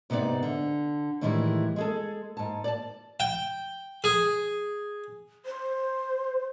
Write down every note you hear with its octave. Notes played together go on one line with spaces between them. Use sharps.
G#2 C3 B3 D#4 D5
D3
A2 D#3 E3 G3 G#3
G#3 G#4 A4
G#2 A5
D5 A5
G5
G#4
C5